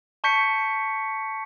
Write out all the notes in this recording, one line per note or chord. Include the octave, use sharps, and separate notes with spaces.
A5 C#6 G6 B6 C#7